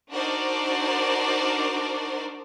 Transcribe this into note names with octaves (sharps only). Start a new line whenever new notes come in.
D4 D#4 F#4 A#4 C5 D5